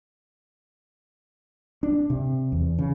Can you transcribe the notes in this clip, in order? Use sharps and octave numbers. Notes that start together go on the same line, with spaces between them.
D4
C3
E2
C#3